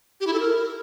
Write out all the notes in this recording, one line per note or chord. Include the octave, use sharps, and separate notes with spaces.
G4
E4
A4
A#4